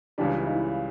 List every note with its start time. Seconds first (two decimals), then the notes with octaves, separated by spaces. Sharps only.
0.18 C#2 C#3 E3 G3 D4
0.37 E4
0.46 D#4
0.54 E4